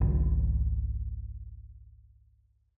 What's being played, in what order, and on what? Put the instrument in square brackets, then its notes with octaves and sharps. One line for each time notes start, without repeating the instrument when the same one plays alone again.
[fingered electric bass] G#1 C#2